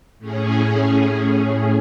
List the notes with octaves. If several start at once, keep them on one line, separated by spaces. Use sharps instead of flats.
A2 C#4 G#4